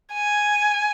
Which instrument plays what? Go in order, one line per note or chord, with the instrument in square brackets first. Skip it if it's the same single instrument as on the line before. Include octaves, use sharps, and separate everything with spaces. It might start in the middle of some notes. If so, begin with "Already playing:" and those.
[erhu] G#5